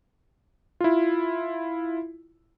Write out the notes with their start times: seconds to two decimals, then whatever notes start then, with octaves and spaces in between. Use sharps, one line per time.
0.80 E4 F4